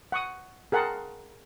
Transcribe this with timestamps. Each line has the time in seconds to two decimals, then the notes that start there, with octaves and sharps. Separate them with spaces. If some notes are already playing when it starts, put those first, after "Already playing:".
0.12 F#5 C#6 D#6
0.72 G#4 A#4 F#5 G5 A5 C6